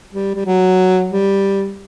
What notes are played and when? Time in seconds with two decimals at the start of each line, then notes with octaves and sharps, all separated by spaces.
0.13 G3
0.35 G3
0.46 F#3
1.11 G3